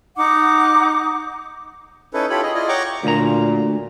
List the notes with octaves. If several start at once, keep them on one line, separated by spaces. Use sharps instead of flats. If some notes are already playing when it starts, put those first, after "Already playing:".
D#4 F#5 D6
C#4 D#4 E4 A4 B4
E4 F4 G4 A4 C#5 B5
G#4 D#5
E4 F4 D5 D#5
C#5 F#5 G5 A#5 C#6 D6
D2 A#2 A#5